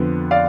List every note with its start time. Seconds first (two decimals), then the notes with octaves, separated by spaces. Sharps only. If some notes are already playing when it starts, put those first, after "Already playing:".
Already playing: F2 D3 F3 B3
0.31 D5 F5